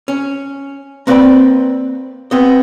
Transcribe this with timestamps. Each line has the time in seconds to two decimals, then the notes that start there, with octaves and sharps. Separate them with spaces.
0.08 C#4
1.07 A#3 C4 B4 D5 G5 B5
2.31 B3 C4 D#5